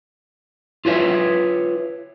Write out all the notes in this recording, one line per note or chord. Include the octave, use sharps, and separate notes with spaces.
F4 B4 C#5 E5